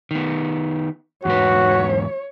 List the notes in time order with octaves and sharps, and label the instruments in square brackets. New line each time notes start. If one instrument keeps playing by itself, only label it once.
[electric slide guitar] D#3 B3
[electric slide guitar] E2 G#2 B4 [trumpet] F#4 [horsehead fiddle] C#5